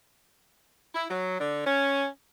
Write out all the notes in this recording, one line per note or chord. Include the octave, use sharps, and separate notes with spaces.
E4
F#3
D3
C#4